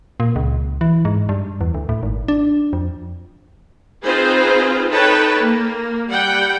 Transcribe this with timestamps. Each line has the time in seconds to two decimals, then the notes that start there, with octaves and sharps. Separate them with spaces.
0.20 A#2
0.36 C#2
0.81 E3
1.05 G#2
1.29 G2
1.61 E2
1.74 D2
1.89 A2
2.03 G#1
2.28 D4
2.73 F2
4.03 C4 D#4 F4 G#4 B4 C5
4.90 D#4 A4 B4 C#5 G5 A5
5.38 A#3
6.09 G3 F#5 G5